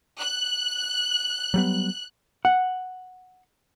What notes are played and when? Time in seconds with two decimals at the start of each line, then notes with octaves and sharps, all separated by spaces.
0.19 F#6
1.54 F#3 G3 B3
2.45 F#5